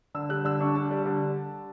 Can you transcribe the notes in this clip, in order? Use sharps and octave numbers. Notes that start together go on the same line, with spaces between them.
D3 E6
G3 F#6
D3 E6
D4 C#6
G3 A5
G3
D3